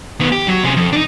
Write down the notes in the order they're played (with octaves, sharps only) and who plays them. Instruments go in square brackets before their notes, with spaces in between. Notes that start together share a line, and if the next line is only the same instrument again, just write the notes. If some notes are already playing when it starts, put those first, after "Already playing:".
[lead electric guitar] D#3 B3
G4
F#3
C3 G#4
F2
D4 D#4